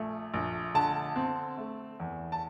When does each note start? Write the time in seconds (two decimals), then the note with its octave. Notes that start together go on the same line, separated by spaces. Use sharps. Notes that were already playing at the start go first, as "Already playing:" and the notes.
Already playing: A#1 A3
0.34 A#1
0.74 D3 A5
1.16 C4
1.58 A3
2.00 E2
2.32 A5